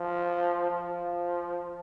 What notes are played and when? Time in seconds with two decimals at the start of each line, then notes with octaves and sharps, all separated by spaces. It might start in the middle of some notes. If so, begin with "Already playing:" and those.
Already playing: F3
0.71 F3